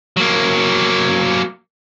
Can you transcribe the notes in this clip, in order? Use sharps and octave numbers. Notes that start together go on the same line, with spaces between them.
F#3 A#3